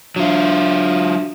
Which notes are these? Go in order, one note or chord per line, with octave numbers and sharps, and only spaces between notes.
F#3 D4 F4 E5